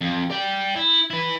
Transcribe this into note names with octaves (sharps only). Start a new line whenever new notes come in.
F2
D5 G5
E4
E4 B4